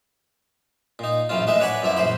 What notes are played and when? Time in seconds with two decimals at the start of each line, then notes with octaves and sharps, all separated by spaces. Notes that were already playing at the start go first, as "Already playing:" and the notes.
0.99 A#2 D#4
1.29 A#1 F#2 E3 F#3 F4
1.47 A2 G#3 D#4 B4 E5
1.60 B4 C#5 D5 F#5 G#5 B5
1.82 F#2 F3 E4 D5
1.96 A#1 F#2 E3 C5 B5